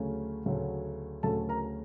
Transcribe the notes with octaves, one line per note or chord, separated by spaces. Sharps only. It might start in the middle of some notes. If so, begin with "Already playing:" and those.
Already playing: D2 C#3 F#3 A3 C#4
D2 C#3 F#3 A3 C#4
D2 C#3 F#3 A3 C#4 A4 A5
A#4 A#5